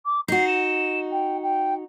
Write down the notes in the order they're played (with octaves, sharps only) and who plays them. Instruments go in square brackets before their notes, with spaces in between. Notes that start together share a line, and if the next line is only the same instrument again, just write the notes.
[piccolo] D6
[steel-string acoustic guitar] D#4 F#4 [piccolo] C7
[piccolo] E7
G5
G5